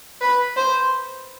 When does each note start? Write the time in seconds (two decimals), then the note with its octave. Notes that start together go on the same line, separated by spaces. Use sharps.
0.21 B4
0.57 C5